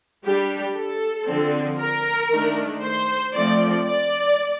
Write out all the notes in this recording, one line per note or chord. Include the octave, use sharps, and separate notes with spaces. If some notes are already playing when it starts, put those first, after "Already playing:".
G3 D4 G4
A4
D3 F3 C4
A#4
D#3 A3 D4
C5
F3 A3 C4 D5
D5